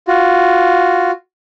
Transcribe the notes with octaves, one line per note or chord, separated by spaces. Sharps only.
F4 F#4